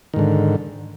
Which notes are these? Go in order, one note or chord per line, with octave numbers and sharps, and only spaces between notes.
G#2 D3 D#3